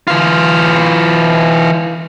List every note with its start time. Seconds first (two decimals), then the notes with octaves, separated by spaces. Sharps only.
0.07 E3 F4